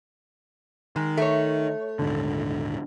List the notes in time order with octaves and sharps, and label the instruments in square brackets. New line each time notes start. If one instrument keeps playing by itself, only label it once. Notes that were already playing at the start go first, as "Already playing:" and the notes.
[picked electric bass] D#3 [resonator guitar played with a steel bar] G#3
[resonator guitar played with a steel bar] A3 C#5
[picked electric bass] D#1 G#2 D3